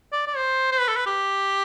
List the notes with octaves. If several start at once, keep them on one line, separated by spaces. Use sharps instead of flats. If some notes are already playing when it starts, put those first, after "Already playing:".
D5
D5
C5
C5
B4
A4
B4
G4